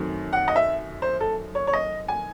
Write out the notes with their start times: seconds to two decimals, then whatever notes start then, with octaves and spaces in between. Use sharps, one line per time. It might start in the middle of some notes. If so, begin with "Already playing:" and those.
Already playing: F#2 D#3 A3 C4
0.33 F#5
0.48 D#5
0.56 E5
1.02 C5
1.20 A4
1.55 C#5
1.67 C#5
1.73 D#5
2.08 G#5